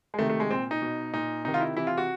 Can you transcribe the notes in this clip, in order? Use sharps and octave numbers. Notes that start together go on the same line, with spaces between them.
G#3
C3 D#3 A3
A3
G#3
A#2 C4
D#4
B2
A#2 D#4
C3 D#3 D#4
F4
E4
C3 E3 E4
F4
F#4